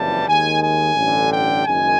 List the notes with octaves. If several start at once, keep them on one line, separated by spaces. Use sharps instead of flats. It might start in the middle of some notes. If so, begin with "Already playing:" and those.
Already playing: F#1 F2 C#3 E3 G3 A5
D#2 D#3 G#3 G#5
G#5
A1 G2 D3
G5
F#1 F#2 D#3 G#3 G#5